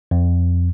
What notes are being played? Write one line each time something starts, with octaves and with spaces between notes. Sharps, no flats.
F2